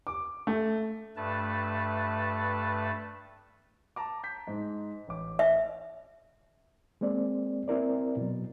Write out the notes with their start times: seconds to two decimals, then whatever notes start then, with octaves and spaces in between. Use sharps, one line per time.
0.07 D6
0.47 A3
1.16 G2 A3 B4 A5
3.96 A5 A#5 D6
4.24 G6 B6
4.47 G#2
5.08 A1 D6
5.39 E5
7.01 G#3 A#3 C4 D5
7.68 C4 E4 A#4 D5
8.17 B2 F#3